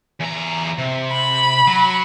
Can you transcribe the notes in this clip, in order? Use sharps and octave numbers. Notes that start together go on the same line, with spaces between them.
E2 A#5
C3
B5
F#3